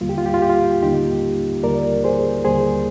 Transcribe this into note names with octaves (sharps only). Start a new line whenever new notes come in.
D#2 D3 G3 A#3 F4
G4
F4
G4
F4
G4
F4
D#2 D3 G3 A#3 D#4 G4
D#2 D3 G3 A#3 A#4 D5
G#4 C5
D#2 D3 G3 A#3 G#4 C5